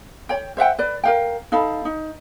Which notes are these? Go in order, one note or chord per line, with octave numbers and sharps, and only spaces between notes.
C#5 G5
C5 E5 F#5 G5
B4 D5
A#4 F5 G5
D#4 A4 F5 B5
D#4